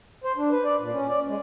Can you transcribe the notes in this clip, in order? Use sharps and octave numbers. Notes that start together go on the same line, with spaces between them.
C5
D4
B4
D5
A#2
C#4
D5
G#3